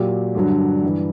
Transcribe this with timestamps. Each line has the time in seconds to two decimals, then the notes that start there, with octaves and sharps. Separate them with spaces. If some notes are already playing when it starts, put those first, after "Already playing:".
Already playing: A#2 F#3 G4
0.35 G2 D3 F#3
0.83 G2 E3